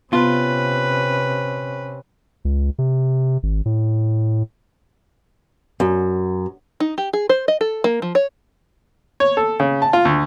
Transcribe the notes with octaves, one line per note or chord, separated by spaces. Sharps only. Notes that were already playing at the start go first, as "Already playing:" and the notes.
C3 B3 C#4 F4 B4
C#2
C3
G#1
A2
F#2
D#4
G4
G#4
C5
D#5
A4
A#3
F3
C#5
C#5
A4
C#3
A5
F4
D2